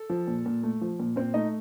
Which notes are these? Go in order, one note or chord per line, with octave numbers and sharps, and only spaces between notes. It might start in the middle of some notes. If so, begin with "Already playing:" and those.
Already playing: A4
F3
A#2
A#2
A3
F3
A#2
A#2 C4 C5
A3 D#4 D#5